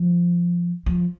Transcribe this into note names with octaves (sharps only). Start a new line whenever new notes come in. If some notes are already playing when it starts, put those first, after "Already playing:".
Already playing: F3
F3